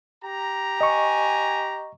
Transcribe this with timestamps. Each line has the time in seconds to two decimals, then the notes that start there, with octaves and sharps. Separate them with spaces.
0.24 G4 A#5
0.81 D#5 G#5 C#6